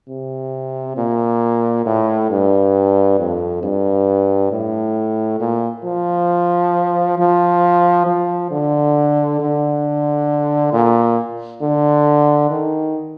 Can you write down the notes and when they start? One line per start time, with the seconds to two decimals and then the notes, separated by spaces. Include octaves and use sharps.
0.08 C3
0.97 A#2
1.86 A2
2.30 G2
3.19 F2
3.63 G2
4.51 A2
5.40 A#2
5.84 F3
7.18 F3
8.06 F3
8.51 D3
9.40 D3
10.73 A#2
11.62 D3
12.50 D#3